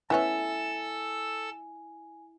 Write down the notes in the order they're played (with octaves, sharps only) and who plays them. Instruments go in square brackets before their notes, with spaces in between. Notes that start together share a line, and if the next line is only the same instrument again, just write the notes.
[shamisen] A3 B3 C#4 [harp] E4 E5 [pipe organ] A4 E6 [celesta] G#5